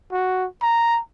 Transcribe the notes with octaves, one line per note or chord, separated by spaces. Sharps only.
F#4
A#5